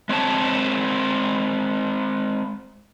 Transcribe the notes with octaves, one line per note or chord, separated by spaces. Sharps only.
G#3 C4 C#5 A5